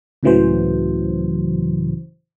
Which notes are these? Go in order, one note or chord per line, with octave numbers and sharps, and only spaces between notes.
C#2 A2 C#3 E3 F#3 C5